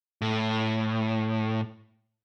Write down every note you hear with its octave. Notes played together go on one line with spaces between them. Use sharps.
A2